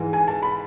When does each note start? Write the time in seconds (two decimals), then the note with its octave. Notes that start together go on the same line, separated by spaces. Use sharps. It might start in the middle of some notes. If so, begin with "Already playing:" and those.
Already playing: G#2 E3
0.13 G#5
0.28 A5
0.43 B5